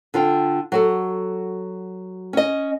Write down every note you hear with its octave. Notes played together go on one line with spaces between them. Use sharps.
D3 F4 G5
F#3 F#4 A4
C#4 D#5